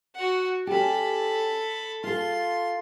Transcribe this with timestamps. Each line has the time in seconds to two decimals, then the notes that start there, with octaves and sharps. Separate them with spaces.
0.15 F#4 F#5
0.67 C#4 G4 A4 B5
2.04 F4 A4 C6